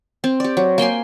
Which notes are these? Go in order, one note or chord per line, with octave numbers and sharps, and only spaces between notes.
C4
G4 D5
F#3
A#3 G5 G#5 C6